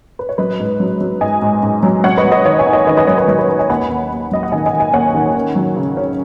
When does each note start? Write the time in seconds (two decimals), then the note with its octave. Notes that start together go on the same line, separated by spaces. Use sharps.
0.19 B4
0.29 C#5
0.38 F#3 B4 D#5
0.60 G#2
0.80 F#3
1.01 F#3
1.21 G#2 D#5 G#5
1.42 G#2
1.63 G#2
1.83 F#3
2.04 F#3 C#5 F#5
2.18 B4 D#5
2.25 F#3
2.32 B4 D#5
2.45 D#3 C#5 F#5
2.59 D#5 G#5
2.66 D#4
2.73 D#5 G#5
2.87 D#3 B4 D#5
2.97 B4 D#5
3.07 F#3 C#5
3.18 B4 D#5
3.28 F#3 C#5
3.39 B4
3.49 D#4 B4
3.59 D#5 G#5
3.70 D#2 F#5 B5
3.90 D#2
4.11 D#2
4.31 F#3 D#5
4.43 F#5
4.52 D#3 D#5 G#5
4.66 D#5 G#5
4.73 D#3
4.80 D#5 G#5
4.93 D#2 C#5 F#5
5.15 D#3
5.35 C#4
5.56 F#3
5.76 C#3
5.97 C#4